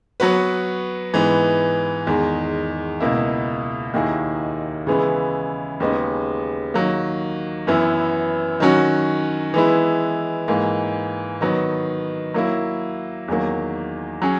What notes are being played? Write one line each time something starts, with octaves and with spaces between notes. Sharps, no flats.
F#3 B3 F#4 B4
G#2 E3 B3
E2 D#3 G#3
C#2 B2 A#3 E4
D#2 D#3 A#3 E4 G#4
C#3 E3 G#3 B3 E4
D#2 C#3 G#3 B3 D#4
D#3 F#3 A#3
F#2 E3 B3 E4
D#3 F#3 C#4 F#4
E3 G#3 B3 E4
G#2 E3 A#3
D#3 F#3 B3 D#4
F#3 A#3 E4
E2 D#3 F#3 A#3
F#3 C#4 G#4